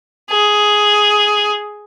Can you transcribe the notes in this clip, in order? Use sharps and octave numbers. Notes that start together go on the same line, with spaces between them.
G#4